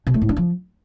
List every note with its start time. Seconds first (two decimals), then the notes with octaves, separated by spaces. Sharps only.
0.07 B2
0.14 A3
0.22 A2
0.29 D4
0.37 F3